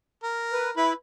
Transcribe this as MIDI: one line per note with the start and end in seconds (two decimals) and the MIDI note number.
0.23 0.72 70
0.52 0.71 71
0.77 0.93 64
0.77 0.92 71
0.77 0.93 83